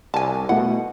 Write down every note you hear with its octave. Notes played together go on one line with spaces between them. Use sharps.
C2 G#5 A5
B2 A3 E4 F#5